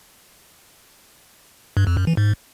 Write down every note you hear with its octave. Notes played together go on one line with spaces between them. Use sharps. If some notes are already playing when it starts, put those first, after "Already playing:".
G2
F2
F#2
E3
G#2